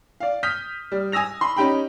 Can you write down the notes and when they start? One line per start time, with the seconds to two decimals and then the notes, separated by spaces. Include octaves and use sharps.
0.20 D5 F5
0.43 D#6 F6 G6 B6
0.92 G3
1.12 G#5 D#6 E6 A#6 F7
1.41 B5 C6
1.57 C#4 D#4 G4 G5 B5